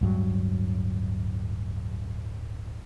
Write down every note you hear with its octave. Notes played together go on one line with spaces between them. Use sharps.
D1 G2 F#3